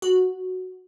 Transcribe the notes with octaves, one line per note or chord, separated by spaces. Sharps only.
F#4